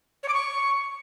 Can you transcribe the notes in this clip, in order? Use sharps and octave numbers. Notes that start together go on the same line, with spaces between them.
C#5
D6
C#6